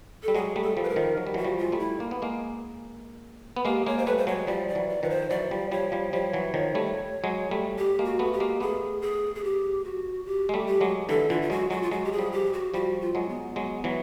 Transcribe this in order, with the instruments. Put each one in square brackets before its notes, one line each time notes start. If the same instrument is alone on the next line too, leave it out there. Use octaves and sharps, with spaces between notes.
[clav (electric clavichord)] G3 [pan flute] A4
[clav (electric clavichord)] F#3 G#3 [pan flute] G#4
[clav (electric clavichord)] G3 A3
[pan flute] A4
[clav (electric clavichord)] F3 G3
[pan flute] B4
A#4
[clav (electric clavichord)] D#3 F3
F#3
G3
[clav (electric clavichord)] E3 F#3 [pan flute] F#4
[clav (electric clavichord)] F3 G3
[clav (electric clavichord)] G#3 [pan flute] F4
[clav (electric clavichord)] G3 A3
[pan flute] E4
[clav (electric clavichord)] A#3
B3
G#3 A#3
B3
[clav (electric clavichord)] G#3 A#3 [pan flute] G4
[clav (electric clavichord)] G#3 A#3 [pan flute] C#5
[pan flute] C5
[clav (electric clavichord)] G3 A3 [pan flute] B4
[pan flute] C5
[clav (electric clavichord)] F#3 G#3 [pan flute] C#5
[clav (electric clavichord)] F3 G3 [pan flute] D5
[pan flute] D5
[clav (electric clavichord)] E3 F#3
[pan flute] D5
[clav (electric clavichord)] D#3 F3 [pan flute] B4
[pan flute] C5
[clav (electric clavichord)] E3 F#3 [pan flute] D5
[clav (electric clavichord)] F3 G3
[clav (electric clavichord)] F3 G3 [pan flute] C#5
[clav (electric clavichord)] F3 G3
[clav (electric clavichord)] F3 G3 [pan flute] C#5
[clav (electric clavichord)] E3 F#3
D#3 F3
G3 A3
F#3 G#3
G3 A3
[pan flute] G4
[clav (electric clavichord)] G#3 A#3
[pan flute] F#4
[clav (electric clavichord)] A3 B3
[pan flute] G4
[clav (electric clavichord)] G#3 A#3
[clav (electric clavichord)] A3 B3 [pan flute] G#4
[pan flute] G#4
G#4
G4
F#4
G4
[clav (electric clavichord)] G#3
G3 A3
[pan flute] G4
[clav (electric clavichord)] F#3 G#3
[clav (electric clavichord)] D3 E3 [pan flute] A4
[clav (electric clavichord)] D3 E3 [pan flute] F4
[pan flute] F4
[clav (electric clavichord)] F#3 G#3 [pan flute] F#4
[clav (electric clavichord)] F#3 G#3 [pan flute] F#4
[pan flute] F4
[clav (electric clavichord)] F#3 G#3 [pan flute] F#4
[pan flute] G4
G#4
[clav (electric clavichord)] F3 G3
[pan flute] G4
F#4
[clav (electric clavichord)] F3 G3 [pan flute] F#4
[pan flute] F4
[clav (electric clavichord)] F#3 G#3
[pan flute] B3
[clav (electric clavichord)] F#3 G#3
E3 F#3